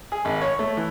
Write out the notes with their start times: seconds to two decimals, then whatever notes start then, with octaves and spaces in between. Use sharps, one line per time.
0.12 G#4
0.25 G#1
0.41 C#5
0.59 A3
0.77 E3